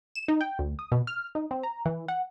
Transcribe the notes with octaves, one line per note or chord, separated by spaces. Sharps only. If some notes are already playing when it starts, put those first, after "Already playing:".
E7
D#4
G5
D2
D#6
B2
F6
D#4
C4
A#5
E3
F#5